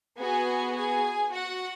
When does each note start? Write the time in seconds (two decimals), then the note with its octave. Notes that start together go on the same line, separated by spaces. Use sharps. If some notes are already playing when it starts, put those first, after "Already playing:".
0.20 B3 F#4 G#4 G#5
0.75 G#4 G#5
1.32 F#4 F#5